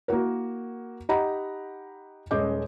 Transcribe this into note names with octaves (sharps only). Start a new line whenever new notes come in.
A#3 E4 F#4 A#4
D#4 G4 D#5 F#5 A#5 B5
D#1 G#3 C#4 D#5 D6 G6